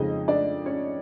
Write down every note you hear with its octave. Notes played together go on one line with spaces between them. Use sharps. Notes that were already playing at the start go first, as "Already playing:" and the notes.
Already playing: F2 C#3 F3 G#3 D#4 D#5
D4 D5
C#4 C#5